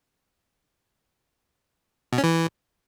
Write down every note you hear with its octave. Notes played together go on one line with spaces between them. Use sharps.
B2
C#4
E3